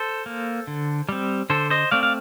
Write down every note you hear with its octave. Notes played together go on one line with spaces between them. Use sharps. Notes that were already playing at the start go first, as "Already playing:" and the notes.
Already playing: A4 C5
A#3
D3
G3 C4
D3 A4 C5
C5 D#5
A3 C4 D5 F5
F5